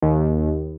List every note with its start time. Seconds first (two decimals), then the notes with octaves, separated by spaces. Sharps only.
0.02 D#2